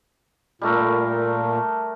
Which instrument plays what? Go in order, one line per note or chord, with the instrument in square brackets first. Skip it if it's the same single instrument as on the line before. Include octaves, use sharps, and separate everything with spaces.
[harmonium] A#2 [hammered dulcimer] G3 A3 A#4